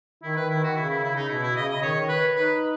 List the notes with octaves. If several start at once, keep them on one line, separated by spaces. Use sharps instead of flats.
D#3 E4
B4
D#3 E4
F#4
C#3 E4
E4
E4
D#4
B2 E4
E4
C#3 D#5
D#5
D#3 C#5
B4
D#4 B4